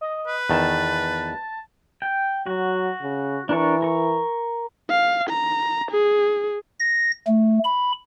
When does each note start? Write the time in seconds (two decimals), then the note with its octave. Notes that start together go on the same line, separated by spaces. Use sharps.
0.01 D#5
0.27 B4
0.50 E2 D#3 A5
2.02 G5
2.46 F#3 F#4
3.02 C#3
3.49 E3 D4 A#4 C#6
3.82 A#4 C#6
4.90 F5
5.30 A#5
5.91 G#4
6.80 A#6
7.27 A3
7.65 B5